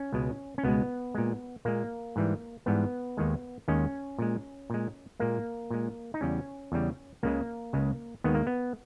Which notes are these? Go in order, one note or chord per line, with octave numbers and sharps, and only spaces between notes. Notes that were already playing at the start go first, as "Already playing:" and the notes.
Already playing: C#4
C#2 B2 G#3
C#4
C#2 B2 G#3 B3
A#2 G#3
A#2 G#3 A#3
G#2 E3 G3
G#2 E3 G3 B3
D#2 D#3 G#3
D#2 D#3 G#3 C#4
A#2 G#3
A#2 G#3
A#2 G#3 A#3
A#2 G#3
D#4
E2 C#3 G3 C#4
E2 C#3 G3
C#2 C#3 G#3 A#3
C#2 C#3 G#3
D#2 D#3 G#3 B3
A#3
B3